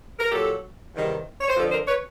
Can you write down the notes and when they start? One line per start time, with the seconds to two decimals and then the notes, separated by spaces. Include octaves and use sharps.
0.19 A#4
0.31 A#2 F#3 G4 A4
0.94 E2 C3 D#3 G3
1.41 C#5
1.49 C5
1.57 F2 D3 F3 A4 B4
1.72 A#4 C5
1.88 B4 C#5